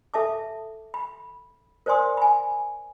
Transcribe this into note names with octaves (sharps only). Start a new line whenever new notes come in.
A4 E5 A5 D6
B5
A#4 C5 D5 G#5 C6 D#6
G#5 B5